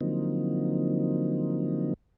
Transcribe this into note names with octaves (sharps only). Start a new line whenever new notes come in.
D3 F3 F#3 A#3 C4 D#4